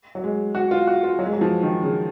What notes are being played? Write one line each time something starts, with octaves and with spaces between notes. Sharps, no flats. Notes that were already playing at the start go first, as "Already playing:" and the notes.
F#3
G#3
F#4
F4
F#4
F4
F#3
G#3
F#3
F3
D#3
C#3